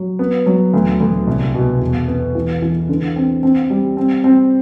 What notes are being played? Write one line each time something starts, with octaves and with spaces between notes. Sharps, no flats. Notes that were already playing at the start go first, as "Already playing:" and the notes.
Already playing: F#3
B3
F#3
D2
D2
C2
B2
E2
B3
E3
E3
D3
C4
C4
G3
C4
C4